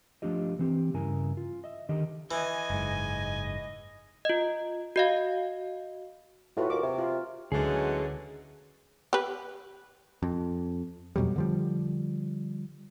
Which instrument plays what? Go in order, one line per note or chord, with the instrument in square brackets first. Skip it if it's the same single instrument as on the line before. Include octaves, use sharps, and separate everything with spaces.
[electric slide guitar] F3 A3 D4 F4 G4 D#5
E3 C4 G4
G2 C#3 E4 A#4 G#5
F4
D#5 E5
D3 D#3 G4 D#5 G5
[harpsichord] E3 [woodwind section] D#5 [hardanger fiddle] G#5
[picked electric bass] F#1 G#2
[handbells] F4 D#5
F#4 D#5 F5
[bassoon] A2 [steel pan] F4 F#4 B4
[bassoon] D#2 [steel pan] D6
[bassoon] C3
[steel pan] F4
[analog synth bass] D2 [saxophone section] D3 E3 C#4 [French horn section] F#3 G#3 [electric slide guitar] G#4
[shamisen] G4 B4
[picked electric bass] F2
F2 B2 F#3 G3
D3 F3 G3